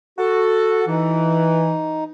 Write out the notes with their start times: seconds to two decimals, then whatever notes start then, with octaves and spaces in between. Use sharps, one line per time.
0.19 F#4 A4
0.87 E3 D#4